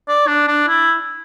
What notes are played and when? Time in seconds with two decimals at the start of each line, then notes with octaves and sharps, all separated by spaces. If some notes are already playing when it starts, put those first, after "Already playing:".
0.08 D5
0.27 D4
0.48 D4
0.67 E4